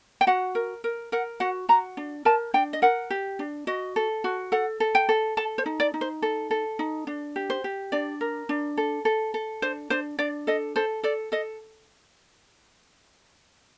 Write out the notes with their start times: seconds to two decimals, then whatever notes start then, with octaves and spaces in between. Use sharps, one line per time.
0.21 G5
0.27 F#4 F#5
0.55 A#4
0.84 A#4
1.12 A#4 F#5
1.40 F#4 F#5
1.69 F#4 A#5
1.97 D4
2.25 A#4 A5
2.54 D4 G5
2.73 D#5
2.82 A#4 F#5
3.10 G4
3.39 D4
3.67 F#4 D#5
3.96 A4
4.24 F#4
4.52 A4 F#5
4.80 A4
4.95 G5
5.09 A4
5.37 A4 A5
5.58 C5
5.66 D#4
5.80 D5
5.94 D#4
6.01 C5
6.22 A4
6.51 A4
6.79 D#4
7.07 D4
7.36 G4
7.50 C5
7.64 G4
7.92 D4 D5
8.21 A#4
8.49 D4
8.77 A4
9.05 A4
9.34 A4
9.62 D4 C5
9.90 D4 C5
10.19 D4 D5
10.47 A4 D#5
10.76 A4 C5
11.03 A4 D5
11.32 A4 D#5